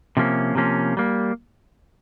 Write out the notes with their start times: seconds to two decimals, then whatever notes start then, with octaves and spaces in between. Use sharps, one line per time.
0.17 C3 F3 A#3 C#4
0.55 C3 F3 A#3 C#4
0.97 G3 A#3